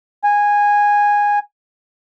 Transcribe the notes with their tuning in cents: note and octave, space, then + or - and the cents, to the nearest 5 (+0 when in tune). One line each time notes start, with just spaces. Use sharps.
G#5 -10